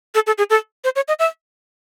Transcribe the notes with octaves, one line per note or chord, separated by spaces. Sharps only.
A4
A4
G#4
A4
C5
C#5
D#5
E5